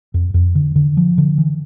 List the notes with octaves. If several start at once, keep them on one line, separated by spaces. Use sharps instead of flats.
F2
F2
D3
D3
F3
D3
E3